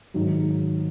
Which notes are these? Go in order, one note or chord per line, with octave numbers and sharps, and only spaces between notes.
G#2 D#3 F#3